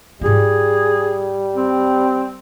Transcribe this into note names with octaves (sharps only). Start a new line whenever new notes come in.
G#2 G3 F4 G#4
C4